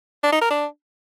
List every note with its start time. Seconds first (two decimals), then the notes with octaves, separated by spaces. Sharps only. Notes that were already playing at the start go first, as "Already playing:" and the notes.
0.24 D4
0.33 D#4
0.41 A#4
0.50 D4